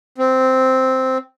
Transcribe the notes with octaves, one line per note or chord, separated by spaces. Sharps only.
C4